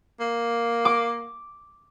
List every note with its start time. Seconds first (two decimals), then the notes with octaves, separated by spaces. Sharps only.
0.20 A#3
0.85 D6